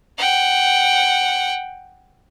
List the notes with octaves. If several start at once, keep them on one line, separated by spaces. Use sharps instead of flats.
F#5 G5